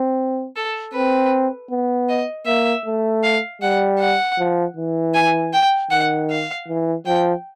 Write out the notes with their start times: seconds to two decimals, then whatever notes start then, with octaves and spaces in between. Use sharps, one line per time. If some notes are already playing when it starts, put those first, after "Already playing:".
Already playing: C4
0.56 A4
0.93 C4 B4
1.70 B3
2.09 D#5
2.46 A#3 E5
2.86 A3
3.24 F5
3.62 G3 F#5
3.99 F#5
4.38 F3
4.76 E3
5.14 G#5
5.53 G5
5.91 D#3 F#5
6.30 F5
6.68 E3
7.06 F3 G5